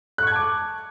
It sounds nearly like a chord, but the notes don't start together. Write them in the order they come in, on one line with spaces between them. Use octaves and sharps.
F#6 C#6 G#6 A5 D6